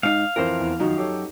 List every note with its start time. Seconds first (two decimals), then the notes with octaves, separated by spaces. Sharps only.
0.03 G#2 D#4 F5
0.36 F2 E3 F3 A#4 C5
0.60 E2
0.80 F#2 D#3 F3 F#3 D#4 F#4
0.97 G4 A4 C#5